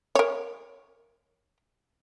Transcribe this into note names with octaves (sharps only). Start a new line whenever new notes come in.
A#4 C#5